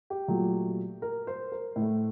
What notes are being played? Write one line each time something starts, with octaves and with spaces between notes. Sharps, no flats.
G4
A#2 F#3 A3
A#4
C5
A#4
A2
A3